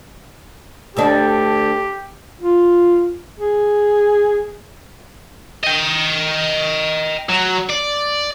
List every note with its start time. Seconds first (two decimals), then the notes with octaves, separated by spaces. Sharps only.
0.96 D2 D3 D4 G4
2.41 F4
3.39 G#4
5.64 D#5 G5
7.29 F#3
7.70 D5